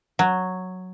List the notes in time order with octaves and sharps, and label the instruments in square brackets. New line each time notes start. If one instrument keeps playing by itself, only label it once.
[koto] F#3